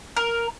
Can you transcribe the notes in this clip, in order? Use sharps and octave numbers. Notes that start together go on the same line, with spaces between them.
A#4